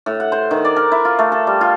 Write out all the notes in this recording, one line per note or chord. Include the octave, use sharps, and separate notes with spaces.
A2
F#5
C5
D#3
D5
A#4
E4
F4
A3
A4
G3
F4